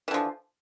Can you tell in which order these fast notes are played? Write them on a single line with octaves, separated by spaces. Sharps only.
E3 D3 F3